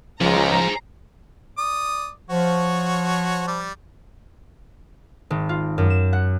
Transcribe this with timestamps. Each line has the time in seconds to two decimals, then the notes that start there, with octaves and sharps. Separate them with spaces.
0.21 C#2 F3 G#4 C5 A#5
1.58 D5 D#6
2.30 F3 F#4 C#5
3.48 G3 D5
5.30 G#1
5.49 F4
5.78 F#2
5.90 E7
6.13 F#5